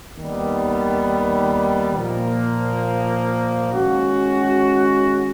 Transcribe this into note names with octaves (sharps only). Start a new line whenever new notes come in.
D#2 D#3 G3 B3
A#2 F3 A#3
D#3 G#3 C#4 F#4